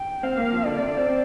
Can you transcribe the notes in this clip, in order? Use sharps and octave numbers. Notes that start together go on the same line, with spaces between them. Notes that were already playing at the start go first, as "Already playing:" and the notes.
Already playing: G5
C4 F5
A#3
F3
D3 D5
C3
D3
C4
C4